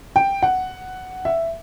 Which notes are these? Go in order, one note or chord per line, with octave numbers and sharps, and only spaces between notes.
G5
F#5
E5